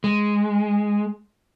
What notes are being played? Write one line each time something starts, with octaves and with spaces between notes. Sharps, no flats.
G#3